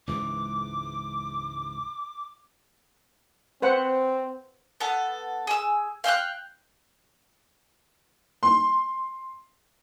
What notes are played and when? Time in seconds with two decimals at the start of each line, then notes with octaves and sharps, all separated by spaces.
0.07 C#2 G#2 E3 D6
3.62 C4 B4 C5 F#5
4.80 B3 A4
5.47 G#4 E6
6.04 F5 G5 E6 F#6
8.43 C6